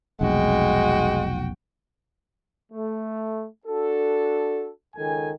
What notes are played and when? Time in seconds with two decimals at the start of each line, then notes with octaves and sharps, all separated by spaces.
0.21 F1 B1 G#3 F#4 G5
2.72 A3
3.66 D4 F#4 A4
4.96 C#2 D#3 A4 G#5